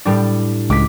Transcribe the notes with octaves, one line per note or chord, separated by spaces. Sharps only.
A2 G3 D4
C#2 D6 B6